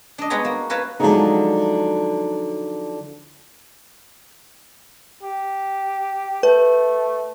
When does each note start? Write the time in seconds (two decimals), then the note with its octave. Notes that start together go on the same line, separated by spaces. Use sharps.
0.18 D4 D#5
0.30 G3 G#3 B3 F#4 C#5 A#5
0.45 A#3
0.70 A#4 B4 C#5 F5 A5
1.00 D3 F3 F#3 G#3 A#3 D#4
5.23 G4
6.43 A3 B4